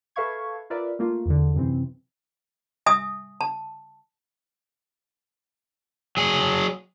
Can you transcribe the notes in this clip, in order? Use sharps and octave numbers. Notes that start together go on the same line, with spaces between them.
A4 B4 E5 F5 C#6 G#6
F4 A#4 B4 D5 E5
A3 A#3 F4
E2 B2 D3
F#2 C3 E3 C4
E5 G#5 D#6
A5
F#3 G#4